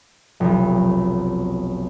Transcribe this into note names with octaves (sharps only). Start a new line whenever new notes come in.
F1 B1